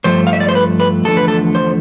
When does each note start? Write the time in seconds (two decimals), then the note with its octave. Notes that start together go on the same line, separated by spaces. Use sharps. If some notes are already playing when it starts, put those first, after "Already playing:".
0.04 G2 F3 A3 C5
0.27 F5
0.33 E5
0.40 D5
0.49 C5
0.55 B4
0.80 B4
1.05 E2 D3 F3 A3 A4
1.17 B4
1.28 A4
1.55 C5